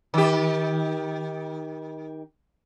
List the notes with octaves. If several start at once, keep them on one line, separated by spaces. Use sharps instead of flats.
D#3 G4